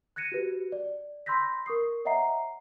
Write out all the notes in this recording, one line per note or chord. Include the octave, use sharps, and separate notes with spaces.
F#6 G#6 A#6 C#7 D#7 E7
F#4 G4 B4
D5
B5 C6 E6 G6 A#6 B6
A#4 C#6 D#6 C7
C#5 D#5 E5 F#5 A#5 C7